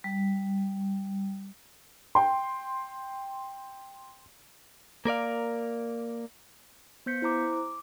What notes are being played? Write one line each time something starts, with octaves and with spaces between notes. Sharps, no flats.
G3
G5 C6
A#3 A#4 D5 F5
B3 C5 G6 B6 C#7
E4 C5 A#5 D6
D6